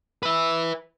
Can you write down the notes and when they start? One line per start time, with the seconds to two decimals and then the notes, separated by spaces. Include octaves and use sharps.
0.23 B4 E5